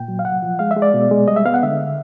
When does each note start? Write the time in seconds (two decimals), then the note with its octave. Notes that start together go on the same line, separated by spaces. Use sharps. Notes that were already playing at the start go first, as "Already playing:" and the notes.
Already playing: A#2 G5
0.08 F#3
0.19 F5
0.25 C2 F#5
0.43 F3
0.59 G#3 F5
0.71 E5
0.76 G#3
0.82 D5
0.94 B2
1.11 G#3
1.28 G3 D#5
1.36 E5
1.45 B3 F5
1.54 F#5
1.63 D3 E5